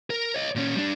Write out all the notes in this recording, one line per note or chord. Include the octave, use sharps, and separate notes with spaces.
A#4
C#5 D#5
A#2 C#4
G3 D4